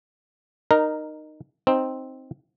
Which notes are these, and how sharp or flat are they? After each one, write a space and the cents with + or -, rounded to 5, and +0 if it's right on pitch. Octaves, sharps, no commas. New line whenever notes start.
D#4 -20 A#4 +0
C4 +0 D#4 +0